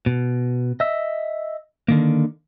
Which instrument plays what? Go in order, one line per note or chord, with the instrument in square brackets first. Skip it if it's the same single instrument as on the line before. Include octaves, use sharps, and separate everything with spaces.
[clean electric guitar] B2
D#5 E5
D3 D#3 A#3